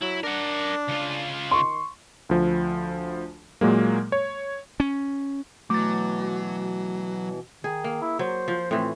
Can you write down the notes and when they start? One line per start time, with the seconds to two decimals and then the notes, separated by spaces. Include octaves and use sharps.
0.02 F#3 E4
0.23 D4 A#4 F#5
0.88 C#3 F4
1.51 D#3 C6 C#6
2.29 D2 F3
3.61 A#2 F#3 G#3 A#3
4.12 C#5
4.80 C#4
5.70 B2 E3 F#3 A3 D6 A6
7.64 D#3 G#4
7.84 A#3
8.02 E4
8.19 F#3 C5
8.48 F3
8.71 A2 E3 C4